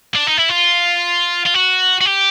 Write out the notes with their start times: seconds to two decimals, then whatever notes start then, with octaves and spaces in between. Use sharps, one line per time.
0.15 D4
0.27 D#4
0.38 E4
0.50 F4
1.46 F4
1.55 F#4
2.01 F#4
2.05 G4